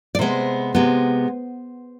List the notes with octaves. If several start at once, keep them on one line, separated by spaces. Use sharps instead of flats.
D5
C3 G#3 B3 C5
C3 G#3 B3